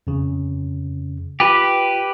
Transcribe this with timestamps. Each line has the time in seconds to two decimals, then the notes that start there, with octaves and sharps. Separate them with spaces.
0.07 F2 C#3
1.40 F4 G4 B4